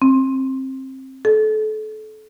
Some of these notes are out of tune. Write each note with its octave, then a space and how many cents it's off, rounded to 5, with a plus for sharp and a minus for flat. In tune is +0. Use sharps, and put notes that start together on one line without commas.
C4 +20
A4 -30